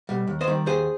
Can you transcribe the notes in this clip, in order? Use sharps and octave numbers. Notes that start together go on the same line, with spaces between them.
B2 G3
D#2
C5 D#5
D#3 G3
D#2 G#4 C5